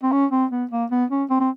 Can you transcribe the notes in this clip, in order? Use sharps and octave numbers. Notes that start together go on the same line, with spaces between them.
C4
C#4
C4
B3
A#3
B3
C#4
C4
C4